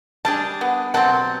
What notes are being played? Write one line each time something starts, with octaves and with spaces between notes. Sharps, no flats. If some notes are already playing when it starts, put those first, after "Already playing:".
G3 D4 G#4 A5
B3
B2 F#3 C4 F#5 A5